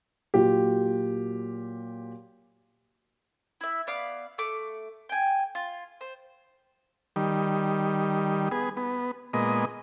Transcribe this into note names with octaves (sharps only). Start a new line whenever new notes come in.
A#2 F#3 G4
E4 E5
B3 D5 F5
A3 D6
G5 G#5
F4
C5
D#3 G3
B3 G#4
B3
A#2 G#3 B3 D#5